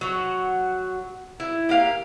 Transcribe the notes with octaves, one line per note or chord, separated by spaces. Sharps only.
F#3 F#4
E4
A#3 G4 F5